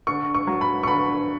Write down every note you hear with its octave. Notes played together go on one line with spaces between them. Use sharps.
D3 C#6
C#6
F#3
B5
C#6
D3 B5